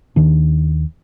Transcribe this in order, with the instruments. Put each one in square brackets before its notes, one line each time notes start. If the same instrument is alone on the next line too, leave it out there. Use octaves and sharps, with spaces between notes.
[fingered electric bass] D#2 D#3 D4